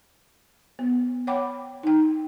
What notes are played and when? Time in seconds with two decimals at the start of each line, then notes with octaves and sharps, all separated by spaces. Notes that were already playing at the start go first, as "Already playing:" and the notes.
0.79 B3
1.27 C#5 F#5 G5 B5 D6
1.83 D#4 G5